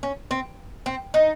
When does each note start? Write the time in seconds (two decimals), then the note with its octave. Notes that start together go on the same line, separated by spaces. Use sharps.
0.03 C#4
0.31 C4
0.86 C4
1.14 D#4